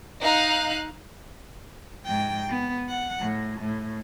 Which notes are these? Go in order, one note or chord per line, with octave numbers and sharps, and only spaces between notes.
D#4 F5 F#6
G#2 G5
B3
F#5
A2
A2